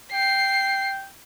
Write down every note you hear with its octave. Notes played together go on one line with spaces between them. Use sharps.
G5 C7